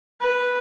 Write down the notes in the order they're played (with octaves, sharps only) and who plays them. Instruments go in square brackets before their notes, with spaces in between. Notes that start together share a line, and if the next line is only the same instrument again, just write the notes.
[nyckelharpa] B4